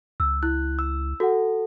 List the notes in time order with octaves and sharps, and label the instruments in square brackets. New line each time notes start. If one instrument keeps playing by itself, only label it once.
[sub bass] C#2 [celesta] E6
[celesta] E4 [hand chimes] F#6
[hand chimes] E6
[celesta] F#4 F#5 [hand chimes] A4